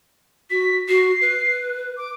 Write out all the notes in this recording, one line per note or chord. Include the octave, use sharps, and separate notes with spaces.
F#4 B6
F#4 C7
B4
D6